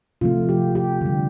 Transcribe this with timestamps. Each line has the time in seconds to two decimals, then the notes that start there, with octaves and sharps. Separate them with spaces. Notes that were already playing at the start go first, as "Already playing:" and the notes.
0.21 C3 F3 A3 F4
0.49 G4
0.75 G4
1.01 D3 G3